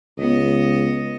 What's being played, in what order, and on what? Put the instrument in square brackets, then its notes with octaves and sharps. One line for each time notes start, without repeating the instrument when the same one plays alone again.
[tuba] C#2 [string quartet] B3 D#5